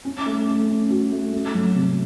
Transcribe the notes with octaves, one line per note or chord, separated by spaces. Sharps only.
C#4
A3
A3
C#4
F#4
A3
A3
F#3
C3